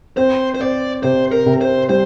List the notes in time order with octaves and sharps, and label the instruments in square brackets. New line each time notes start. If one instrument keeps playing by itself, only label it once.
[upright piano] C4 [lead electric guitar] C5
[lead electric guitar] C5
[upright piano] C4 [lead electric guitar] D5
[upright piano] C3 [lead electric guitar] C5
[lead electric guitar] A#4
[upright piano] C3
[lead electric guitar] C5
[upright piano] G3 [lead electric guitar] C5